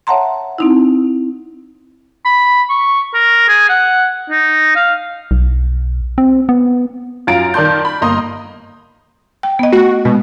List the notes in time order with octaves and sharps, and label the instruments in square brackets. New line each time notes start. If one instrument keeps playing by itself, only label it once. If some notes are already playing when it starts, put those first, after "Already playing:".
[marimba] C#5 E5 F#5 A5 A#5 C6
C4 D#4 E4
[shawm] B5
C#6
A#4
G#4
F#5
D#4
F5
[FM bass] B1
C4
B3
[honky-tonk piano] F#2 F4 F5 A#5 A6 D7
D#3 A#4 D5 A5 C6 G6
B5
G1 A#3 D#5 A#5 C6 D#6
[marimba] G5
B3 D#5
[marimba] A3 [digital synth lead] F#4
[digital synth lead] B2 [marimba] G#3